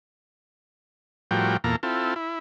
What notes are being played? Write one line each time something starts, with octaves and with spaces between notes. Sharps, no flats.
A2 F3 G3 F#4 A#4 G5
E2 A#2 A#3 A4 A#5
C4 E4 F4 A4
E4